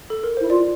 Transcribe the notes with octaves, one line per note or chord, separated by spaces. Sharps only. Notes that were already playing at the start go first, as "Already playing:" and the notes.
A4
A#4
E4 C5
F4 D5